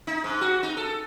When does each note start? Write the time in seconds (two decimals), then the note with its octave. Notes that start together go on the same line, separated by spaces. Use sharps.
0.07 D#4
0.24 G#2
0.41 F#4
0.63 D#4
0.77 A4